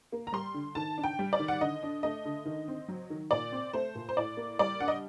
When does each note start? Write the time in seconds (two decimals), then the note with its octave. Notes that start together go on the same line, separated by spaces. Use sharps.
0.12 A#3
0.27 A#5
0.33 G3 C6
0.54 D3
0.75 D#3 A5
0.98 D4
1.04 G5
1.19 G3
1.33 D5
1.40 D#3
1.48 F#5
1.61 D3 D#5
1.83 D4
2.03 A3 D#5
2.25 D3
2.45 D#3
2.68 C4
2.88 F#3
3.10 D#3
3.31 A#2 D5
3.52 C4
3.73 A3 C5
3.95 A#2
4.09 C5
4.17 A2 D5
4.37 A#3
4.59 G3 D5
4.80 D4 F#5
4.88 D#5